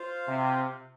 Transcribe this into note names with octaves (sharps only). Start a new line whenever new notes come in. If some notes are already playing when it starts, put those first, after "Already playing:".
Already playing: F4 C5 F5
C3